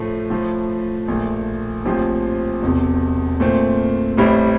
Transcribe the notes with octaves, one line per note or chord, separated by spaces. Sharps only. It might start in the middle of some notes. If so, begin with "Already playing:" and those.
Already playing: A2 F3 A3
A2 F3 A3
A#1 A#2 A3
A#1 A2 F3 C4 G4
E1 E2 C3
A#2 A3 C4
A1 A2 G3 C4 E4